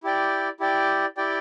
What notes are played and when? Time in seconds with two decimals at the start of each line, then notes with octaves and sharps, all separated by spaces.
0.03 E4 G4 D5 G5
0.60 E4 G4 D5 G5
1.17 E4 G4 D5 G5